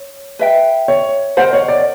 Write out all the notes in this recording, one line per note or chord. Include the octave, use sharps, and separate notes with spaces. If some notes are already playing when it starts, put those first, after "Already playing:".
Already playing: C#5
B4 E5 G5
C#5
A#4 C5 D#5 F#5
C#5
D5